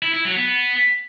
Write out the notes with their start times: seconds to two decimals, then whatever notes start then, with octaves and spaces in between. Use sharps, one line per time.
0.02 E4
0.14 E4
0.25 F#3
0.36 B3